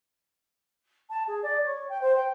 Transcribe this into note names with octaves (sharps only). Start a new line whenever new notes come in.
A5
G#4
D5
C#5
G5
C5
G5